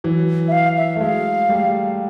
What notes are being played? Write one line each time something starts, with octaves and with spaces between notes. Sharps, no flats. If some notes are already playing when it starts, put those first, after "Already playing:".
E3 F#3
E5
F5
E5
A3
F#3 G#3 F5
G3 A3